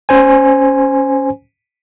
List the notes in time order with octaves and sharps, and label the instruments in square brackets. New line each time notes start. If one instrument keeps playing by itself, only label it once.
[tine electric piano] C#4 C5 G#5